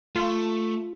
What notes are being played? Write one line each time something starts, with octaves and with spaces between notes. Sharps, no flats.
A3 F4